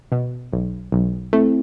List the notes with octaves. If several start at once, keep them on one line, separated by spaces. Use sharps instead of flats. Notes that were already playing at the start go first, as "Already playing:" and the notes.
B2
B1
B1
A3 C4 E4